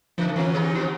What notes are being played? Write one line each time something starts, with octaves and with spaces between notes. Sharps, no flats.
C#3 F3
E3 F3 C#4
G#3 D#4 G4
F3 G3 B3